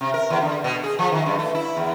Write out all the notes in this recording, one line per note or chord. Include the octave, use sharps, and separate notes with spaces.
C3
A#4
E2
D3
B2
G#4
F3
D#3
G2
A3
E4
E2